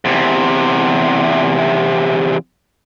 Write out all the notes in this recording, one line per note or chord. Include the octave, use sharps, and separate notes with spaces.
E2 C3